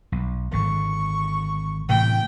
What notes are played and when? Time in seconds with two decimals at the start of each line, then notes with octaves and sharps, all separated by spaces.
0.12 B1
0.53 G#1 D3 C#6
1.89 A2 C3 E3 G5